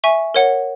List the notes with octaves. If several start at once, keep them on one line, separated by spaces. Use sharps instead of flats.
E5 G#5 C#6
A#4 C#5 F#5